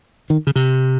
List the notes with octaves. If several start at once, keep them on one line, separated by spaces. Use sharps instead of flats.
D#3
C#3
C3